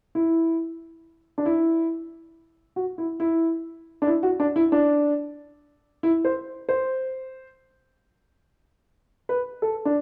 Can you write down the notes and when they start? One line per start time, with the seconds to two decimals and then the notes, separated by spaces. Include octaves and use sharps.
0.15 E4
1.38 D4
1.46 E4
2.76 F#4
2.98 E4
3.20 E4
4.02 D4
4.07 E4
4.23 F#4
4.40 D4
4.56 E4
4.72 D4
6.03 E4
6.25 C5
6.69 C5
9.29 B4
9.62 A4
9.85 D4